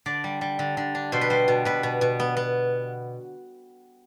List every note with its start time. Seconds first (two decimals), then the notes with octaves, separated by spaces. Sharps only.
0.06 D3 D5
0.24 G3
0.41 G3
0.59 D3
0.77 D3
0.95 D4
1.12 B2 C5
1.21 B4
1.30 G3 C5
1.48 B2
1.65 B2 B4
1.83 B2
2.01 B2
2.20 B3
2.37 B3